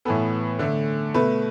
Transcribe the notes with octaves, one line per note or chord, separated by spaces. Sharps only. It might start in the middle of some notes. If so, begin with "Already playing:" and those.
A2 E3 B3 A4
D3 A3
B2 A3 B4